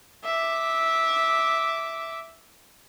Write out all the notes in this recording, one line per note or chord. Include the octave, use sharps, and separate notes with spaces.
E5 D6